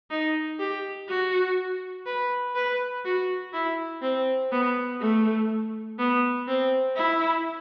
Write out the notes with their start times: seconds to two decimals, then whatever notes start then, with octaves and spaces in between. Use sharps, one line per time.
0.11 D#4
0.59 G4
1.09 F#4
2.06 B4
2.55 B4
3.05 F#4
3.53 E4
4.02 C4
4.52 B3
5.01 A3
5.99 B3
6.48 C4
6.96 E4